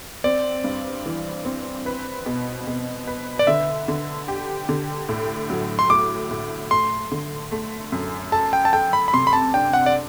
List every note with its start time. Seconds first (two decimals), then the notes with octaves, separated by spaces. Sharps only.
0.24 C4 D5
0.64 G2
1.06 E3
1.45 C4
1.86 B4
2.26 B2
2.67 B2
3.07 B4
3.39 D5
3.47 D3 E5
3.88 D3
4.28 G4
4.69 D3
5.09 A2
5.50 F#3
5.79 C6
5.90 A2 D6
6.31 A2
6.71 A3 C6
7.12 D3
7.52 A3
7.92 F#2
8.32 A4 A5
8.53 G5
8.65 A5
8.73 A4 G5
8.93 B5
9.08 B5
9.13 C3 C6
9.27 B5
9.33 A5
9.54 D4 G5
9.73 F#5
9.86 D5